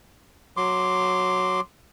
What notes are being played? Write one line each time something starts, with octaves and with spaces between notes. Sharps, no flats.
F#3 C6 D6